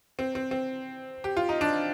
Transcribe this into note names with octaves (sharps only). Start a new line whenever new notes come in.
C4
C4
C4
G4
F4
D#4
D4